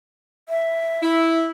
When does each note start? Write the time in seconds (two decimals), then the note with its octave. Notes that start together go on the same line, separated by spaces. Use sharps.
0.49 E5
1.02 E4